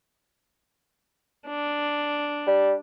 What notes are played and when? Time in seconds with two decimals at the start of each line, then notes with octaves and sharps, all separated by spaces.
1.48 D4
2.47 G3